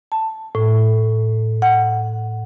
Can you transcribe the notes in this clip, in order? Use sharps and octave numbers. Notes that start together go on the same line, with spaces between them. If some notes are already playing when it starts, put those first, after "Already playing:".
A5
A2
F#5